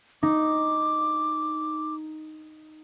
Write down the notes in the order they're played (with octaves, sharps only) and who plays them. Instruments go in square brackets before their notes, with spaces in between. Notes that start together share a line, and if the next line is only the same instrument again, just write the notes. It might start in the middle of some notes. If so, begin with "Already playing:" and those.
[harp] D#4 [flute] D6